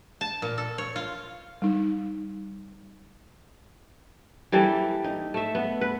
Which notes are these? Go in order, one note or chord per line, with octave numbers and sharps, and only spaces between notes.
A5
A#2
A4
C#5
F4
G3 D#4
E3 G3 A#3 A4
D#4
A3 E5
B3
B4